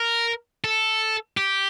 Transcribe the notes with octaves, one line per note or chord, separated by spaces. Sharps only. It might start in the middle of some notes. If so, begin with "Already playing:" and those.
Already playing: A#4
A4
G4